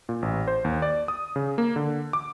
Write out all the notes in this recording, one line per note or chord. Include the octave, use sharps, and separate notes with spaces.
A#2
A1
C5
D#2
D5
D#6
C#3
A#3
D3
D6